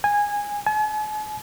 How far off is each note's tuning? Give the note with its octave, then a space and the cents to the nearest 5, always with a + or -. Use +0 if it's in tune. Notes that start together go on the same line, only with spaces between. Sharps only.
G#5 -15
G#5 +45